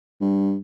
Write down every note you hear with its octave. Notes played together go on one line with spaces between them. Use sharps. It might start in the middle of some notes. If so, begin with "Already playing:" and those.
G2